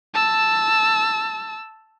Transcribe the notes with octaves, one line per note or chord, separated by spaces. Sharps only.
A5 E6